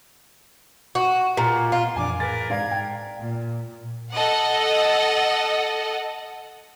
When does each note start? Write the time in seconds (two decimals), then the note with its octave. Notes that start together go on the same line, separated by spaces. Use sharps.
0.95 F#4
1.37 A#2
1.72 F4
1.96 F2 E3 F3 D4 G#5 D6
2.20 A2 G#4 A#4 B4 A6
2.50 G#2 D5 F5 A#5 G#6
2.71 G5
3.20 A#2
4.12 A4 D#5 F#5